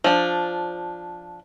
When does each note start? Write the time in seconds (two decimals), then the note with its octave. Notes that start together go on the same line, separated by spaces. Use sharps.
0.04 F3 D4